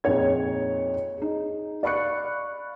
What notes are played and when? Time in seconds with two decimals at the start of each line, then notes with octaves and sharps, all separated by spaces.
0.04 F2 A#2 D#4 G#4 C#5 G#6
1.18 D#4 G#4
1.83 D5 F5 B5 C#6 F#6 C#7